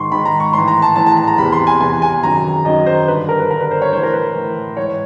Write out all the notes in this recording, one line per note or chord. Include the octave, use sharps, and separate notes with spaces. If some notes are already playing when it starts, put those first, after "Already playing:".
Already playing: G#2 D#3 C6 C#6
G#2 D#3 B5
A#5
C#6
A2 E3 C6
A#5
A5
A2 E3 A5
A5
A5
A#5
E2 C3 E3 B5
C6
G#5
E2 C3 E3 G#5
G#5
F#2 D#3 A#5
F#2 D#3 D#5
C5
G2 D3 B4
A#4
B4
G2 D3 A#4
B4
C5
C#5
A2 E3 C5
A#4
B4
A2 E3
G#2 E3 C#5